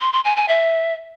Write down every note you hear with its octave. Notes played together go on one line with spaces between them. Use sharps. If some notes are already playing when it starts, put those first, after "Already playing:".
C6
C6
G#5
G#5
E5